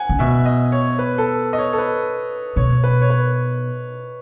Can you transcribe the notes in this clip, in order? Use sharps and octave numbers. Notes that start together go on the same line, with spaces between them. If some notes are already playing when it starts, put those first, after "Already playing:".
Already playing: F#5 G#5
C#3
B2 E5
D#5
C#5
B4
A4
D#5
C#5
A4
B4
B2 C#5
B4
C#5
B4